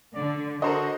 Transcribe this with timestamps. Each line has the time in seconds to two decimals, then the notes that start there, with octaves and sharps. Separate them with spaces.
0.15 D3 D5
0.62 F#4 A4 A#4 C5 D#5